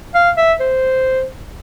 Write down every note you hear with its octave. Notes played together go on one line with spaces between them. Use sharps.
F5
E5
C5